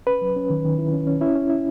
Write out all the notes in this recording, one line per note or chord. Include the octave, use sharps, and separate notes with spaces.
C#4 B4
F#3
C#4
D#3
D#3
E4
C#4
C#4
C#4 E4
C#4
E4